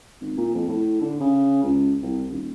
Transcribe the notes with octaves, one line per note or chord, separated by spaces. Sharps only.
G#1
A#2
F2
A2
D3
C#3
C#2
C2
D#1